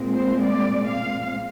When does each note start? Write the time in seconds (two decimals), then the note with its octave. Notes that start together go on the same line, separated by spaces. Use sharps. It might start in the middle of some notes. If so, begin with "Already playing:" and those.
Already playing: A#2 G#3 C4
0.12 C5
0.42 D5
0.87 F5